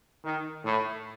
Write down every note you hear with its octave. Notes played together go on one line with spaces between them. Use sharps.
D#3
A2